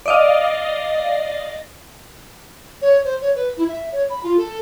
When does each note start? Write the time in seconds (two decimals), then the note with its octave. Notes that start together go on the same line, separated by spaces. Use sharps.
0.06 D5 D#5 F5
2.81 C#5
3.04 C5
3.21 C#5
3.35 B4
3.57 E4
3.68 E5
3.92 C#5
4.09 B5
4.23 F4
4.37 A4